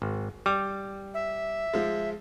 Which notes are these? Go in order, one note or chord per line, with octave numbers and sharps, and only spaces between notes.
G#1
G3 D6
E5
F3 G#3